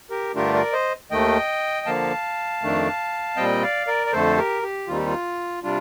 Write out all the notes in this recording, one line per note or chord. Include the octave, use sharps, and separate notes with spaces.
G4 A#4
G2 D3 A3 D4 F4 G4 A#4
A#4 D5
C5 D#5
D#2 D#3 A3 D#5 G5
D3 F3 A#3 F5 A5
F2 D#3 A3 D4
A#2 G3 C4 D#5 G5
D5 F5
A#4 D5
D5
F2 D3 A3 A4 C5
G4 A#4
G4
D#2 D#3 G3 C4 D#4 F4
G4
F4
C3 G3 D4 F4